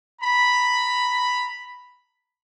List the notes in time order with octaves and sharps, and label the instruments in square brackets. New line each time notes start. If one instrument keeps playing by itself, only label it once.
[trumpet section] A#5 B5